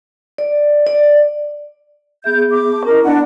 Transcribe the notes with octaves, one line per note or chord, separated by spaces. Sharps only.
D5
D5
B3 G#4 E5 G6
D6
A5
C#4 E4 A#4 D#5
B3 D4 F#5